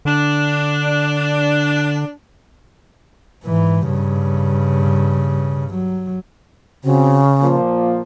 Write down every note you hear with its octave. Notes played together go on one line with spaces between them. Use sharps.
D3 D4
G#2 E3
G2 C#3
F#3
C#3 C4 F#4
A#2 F3 A#3